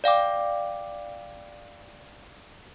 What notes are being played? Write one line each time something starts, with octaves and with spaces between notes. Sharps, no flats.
D5 F5 G5 D6